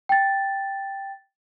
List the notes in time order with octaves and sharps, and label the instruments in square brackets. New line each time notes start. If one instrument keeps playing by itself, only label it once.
[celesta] G5 A6